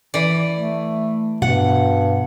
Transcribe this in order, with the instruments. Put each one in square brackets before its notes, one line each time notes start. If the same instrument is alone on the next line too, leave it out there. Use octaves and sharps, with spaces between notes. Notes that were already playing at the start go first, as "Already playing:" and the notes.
[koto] E3 D5
[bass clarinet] A3
[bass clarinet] G2 [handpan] B2 [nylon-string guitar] F#5